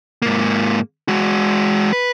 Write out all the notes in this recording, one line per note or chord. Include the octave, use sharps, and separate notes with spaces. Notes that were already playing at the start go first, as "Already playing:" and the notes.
G#2 A#3
G#3 F#4
B4